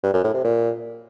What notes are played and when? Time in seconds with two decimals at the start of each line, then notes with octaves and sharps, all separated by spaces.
0.03 G2
0.14 F#2
0.24 A2
0.34 C3
0.44 A#2